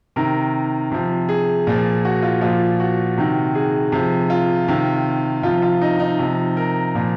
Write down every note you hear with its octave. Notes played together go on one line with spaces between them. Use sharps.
C3 D#3 A#4
C3 F3
G#4
A#2 F3
F#4
F4
A#2 F3 F4
F#4
C3 D#3
G#4
C3 F3
F4
C3 D#3
C3 F3 F4
F4
D#4
D#4
C3 F3
A#4
A#2 F3